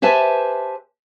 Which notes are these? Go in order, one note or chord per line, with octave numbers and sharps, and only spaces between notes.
G4 B4 C5 E5 G#5 A5